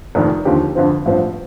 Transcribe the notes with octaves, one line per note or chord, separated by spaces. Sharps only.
F1 F2 D#3
D#2 D3 F3 C4 G4
F2 D3 F3 C4
A1 G2 F3 C4